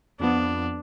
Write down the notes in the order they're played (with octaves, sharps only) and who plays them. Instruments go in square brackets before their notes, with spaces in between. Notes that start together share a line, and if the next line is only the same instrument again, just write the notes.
[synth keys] F2 F3 B3 [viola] D4